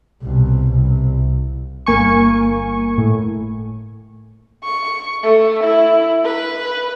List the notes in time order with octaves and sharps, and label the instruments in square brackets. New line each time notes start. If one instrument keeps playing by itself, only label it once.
[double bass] C2 B2
C2
[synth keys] G1 A#3 G#5 C#6
A2
[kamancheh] C#6
A3
E4
B4